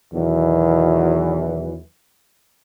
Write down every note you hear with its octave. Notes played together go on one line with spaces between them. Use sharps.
E2 B2 D#3 E3 F#3